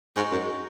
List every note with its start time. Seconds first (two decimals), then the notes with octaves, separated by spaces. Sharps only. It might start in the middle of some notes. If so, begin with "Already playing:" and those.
0.16 G#2 D#4 F#4 C#5
0.31 F#2